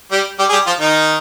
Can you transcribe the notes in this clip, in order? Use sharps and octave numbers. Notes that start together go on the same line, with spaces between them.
G3 G4
G3 G4
G#4
G3 G4
F3 F4
D#3 D#4